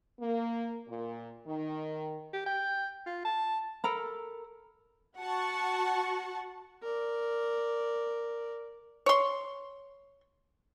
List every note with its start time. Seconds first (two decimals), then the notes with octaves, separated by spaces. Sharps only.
0.21 A#3
0.89 A#2
1.47 D#3
2.33 G4
2.46 G5
3.06 F4
3.25 A5
3.84 A4 A#4 A#5 B5
5.18 F#4 F#5 A5 C#6
6.83 A#4 D5
9.06 C#5 C6